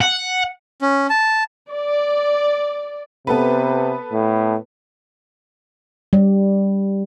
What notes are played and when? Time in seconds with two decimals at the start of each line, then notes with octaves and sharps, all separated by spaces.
0.01 F#5
0.82 C#4
1.10 A5
1.70 D5
3.27 C3 B3 A4 B4
4.12 A2
6.13 G3